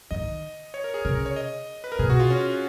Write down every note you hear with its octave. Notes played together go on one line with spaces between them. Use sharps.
D#3 D#5
C#5
A#4
G#4
C#3 A#4
A#4
C#5
D#5
B4
A#4
B2 G#4
F#4
F4
C#4